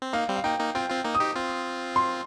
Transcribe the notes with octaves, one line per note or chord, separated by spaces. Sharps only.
C4
A#3 D#4 F5
G3 C4
F5
A#3 D#4 G5
A#3 D#4
C4 F4 G5
C4 F4
A#3 D#4
D#6
D#4 G4
C4 F4
C6